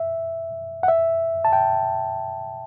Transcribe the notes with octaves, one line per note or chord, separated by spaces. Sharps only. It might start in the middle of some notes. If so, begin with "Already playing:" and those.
Already playing: E5
F#5
E5
A5
G5